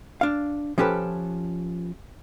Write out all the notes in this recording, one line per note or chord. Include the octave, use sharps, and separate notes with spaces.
D4 F5
F3 C#4 G4 A4 B4